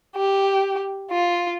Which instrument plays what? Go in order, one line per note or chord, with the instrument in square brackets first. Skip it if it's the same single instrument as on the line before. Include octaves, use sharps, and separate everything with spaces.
[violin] G4
F4